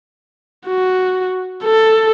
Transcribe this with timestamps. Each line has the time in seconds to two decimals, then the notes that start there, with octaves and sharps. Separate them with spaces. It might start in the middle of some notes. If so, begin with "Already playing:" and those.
0.67 F#4
1.64 A4